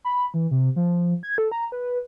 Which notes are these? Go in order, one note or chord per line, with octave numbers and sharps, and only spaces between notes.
B5
E3
C3
F3
G#6
A4
A#5
B4